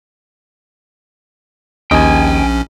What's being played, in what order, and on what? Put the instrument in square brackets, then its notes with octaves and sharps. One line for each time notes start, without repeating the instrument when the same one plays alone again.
[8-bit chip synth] A#1 C#4 [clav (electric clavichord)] D#2 D#5 [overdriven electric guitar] G5 G#5